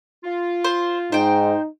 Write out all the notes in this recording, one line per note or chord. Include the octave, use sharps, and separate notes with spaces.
F4
C5
G#2 D#4 C5 G5